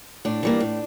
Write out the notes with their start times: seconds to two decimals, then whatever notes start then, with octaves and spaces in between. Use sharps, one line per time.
0.25 A2 D4
0.43 E3 G3 A#3
0.60 A2